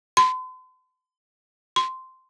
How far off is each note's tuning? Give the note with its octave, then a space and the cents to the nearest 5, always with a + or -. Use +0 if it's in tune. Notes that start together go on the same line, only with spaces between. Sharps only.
C6 -45
C6 -10